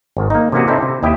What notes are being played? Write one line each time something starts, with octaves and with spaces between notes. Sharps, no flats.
G#1 D#3
A#3 D#4
C3 E3 A#3 C#4 F#4 G#4
C4 D#4 E4 A4 C5 D5
C3
D#2 E4 G4 D#5 E5 G5